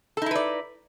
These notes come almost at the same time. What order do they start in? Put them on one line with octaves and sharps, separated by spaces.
A4 D#4 E4 B4 D5